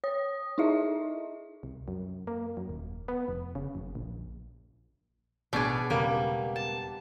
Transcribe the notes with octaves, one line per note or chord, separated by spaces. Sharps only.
C#5 D#6
D#4 E4 G#4 D#5 E5
C2
F#2
A#3
F#2
D#1
B3
F1
C#3
F#1
A#1
A1 B2 D4 G#4
E1 C#3 G3 A#3
A5